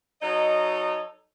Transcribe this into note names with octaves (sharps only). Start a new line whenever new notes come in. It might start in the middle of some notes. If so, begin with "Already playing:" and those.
F#3 D#4 A4 C#5 D#5